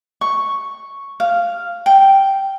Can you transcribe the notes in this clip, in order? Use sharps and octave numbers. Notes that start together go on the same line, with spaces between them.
C#6
F5
G5